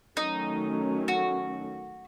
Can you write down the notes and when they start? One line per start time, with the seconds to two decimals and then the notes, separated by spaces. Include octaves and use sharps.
0.17 D#3 F#3 A3 C#4 D#4
1.08 F#4